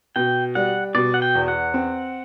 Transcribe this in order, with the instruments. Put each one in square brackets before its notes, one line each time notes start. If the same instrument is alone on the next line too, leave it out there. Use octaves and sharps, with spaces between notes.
[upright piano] B2 [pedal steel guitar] G5
[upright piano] G3 [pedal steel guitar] F#5
[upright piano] B2 [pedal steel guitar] D5
[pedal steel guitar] F#5
G5
[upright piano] E2
[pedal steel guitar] F#5
[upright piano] C4